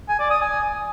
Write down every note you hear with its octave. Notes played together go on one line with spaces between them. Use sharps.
G#5
D5
D#6
G#5